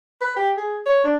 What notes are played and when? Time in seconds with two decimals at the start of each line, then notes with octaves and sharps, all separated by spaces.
0.21 B4
0.36 G4
0.57 G#4
0.86 C#5
1.04 D4